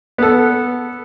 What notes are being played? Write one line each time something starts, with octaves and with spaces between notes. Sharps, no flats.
B3 A4